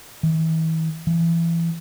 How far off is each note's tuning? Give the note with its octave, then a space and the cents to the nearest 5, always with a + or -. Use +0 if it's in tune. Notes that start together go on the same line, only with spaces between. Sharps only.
E3 -45
E3 +25